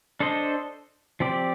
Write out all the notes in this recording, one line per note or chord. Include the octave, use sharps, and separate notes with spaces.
D4 A4 C5 D#5
F3 C4 G4 D5